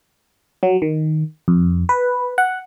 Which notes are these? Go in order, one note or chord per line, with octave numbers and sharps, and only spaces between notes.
F#3
D#3
F2
B4
F#5